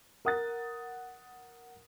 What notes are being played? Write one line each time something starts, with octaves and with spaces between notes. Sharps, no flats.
A#4 F#5 D#6 F#6 A6